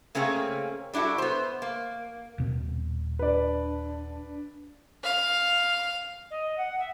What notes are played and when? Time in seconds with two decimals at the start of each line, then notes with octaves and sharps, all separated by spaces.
0.15 C#3 A3 A#3 C4 C#4 G#4
0.93 G3 D4 E4 F#4 A4
1.18 B3 C5
1.62 A#3
2.38 D#1 B2 C4
3.19 D4 B4 D5
5.04 F5
6.31 D#5
6.58 F#5
6.79 E5